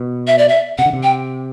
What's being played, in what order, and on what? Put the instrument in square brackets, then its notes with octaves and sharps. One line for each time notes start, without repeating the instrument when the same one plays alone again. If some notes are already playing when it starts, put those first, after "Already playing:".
Already playing: [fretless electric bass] B2
[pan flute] E5
D5
E5
[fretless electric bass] C3 [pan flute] F#5
[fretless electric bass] D3
C3
[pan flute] G5